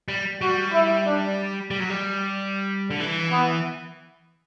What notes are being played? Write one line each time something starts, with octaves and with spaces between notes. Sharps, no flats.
G3
G3 F#4
E4
D4
G3
F#3
G3
D3
E3
B3